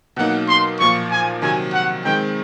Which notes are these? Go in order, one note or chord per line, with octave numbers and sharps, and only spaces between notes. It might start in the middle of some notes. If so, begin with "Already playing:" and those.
B2 F#3 A#3 D#4 F#5
C6
A#2 F3 A#3 C#6
G#5
C3 D#3 F#3 G#5
F#5
D#3 G#3 C4 G5